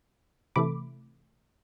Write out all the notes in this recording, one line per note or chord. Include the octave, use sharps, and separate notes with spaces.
C3 E3 A3 B5 D6